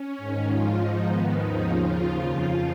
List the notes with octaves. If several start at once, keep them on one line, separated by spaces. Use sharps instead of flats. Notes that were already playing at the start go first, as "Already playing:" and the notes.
Already playing: C#4
G#2 D#3
G#2 F3 F4
G#2 F3 D#4
G#2 D#3 B3
D#2 C#3 F3 D#4
D#2 C#3 F3 F4
D#2 C#3 F3
F2 C#3 F3 F4